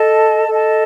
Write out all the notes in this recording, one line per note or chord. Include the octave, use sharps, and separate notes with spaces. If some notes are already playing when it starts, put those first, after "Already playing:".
Already playing: A4 D#5 A5
A4 D#5 A5